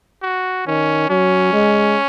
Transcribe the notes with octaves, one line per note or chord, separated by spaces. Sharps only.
F#4
D#3 C#4
F#3 C#4
G#3